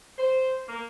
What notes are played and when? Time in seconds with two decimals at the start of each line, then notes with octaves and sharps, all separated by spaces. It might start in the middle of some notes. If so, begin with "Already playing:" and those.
0.19 C5
0.69 A#3